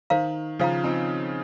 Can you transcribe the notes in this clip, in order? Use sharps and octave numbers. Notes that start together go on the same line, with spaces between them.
D#3 C5 F5 A#5
C#3 F3 C5 F5 A#5
C4 D#4